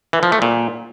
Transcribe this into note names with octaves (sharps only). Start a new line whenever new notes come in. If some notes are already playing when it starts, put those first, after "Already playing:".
E3
F3
A3
A#2